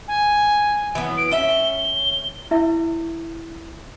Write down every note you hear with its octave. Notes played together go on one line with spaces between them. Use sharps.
G#5
E3 F#3 B3
D7
C#4 E5 G7
E4 E5